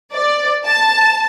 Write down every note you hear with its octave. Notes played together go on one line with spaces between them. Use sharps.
D5
A5